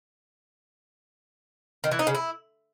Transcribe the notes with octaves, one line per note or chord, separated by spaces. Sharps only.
D#3
E3
D#4
C#3
E4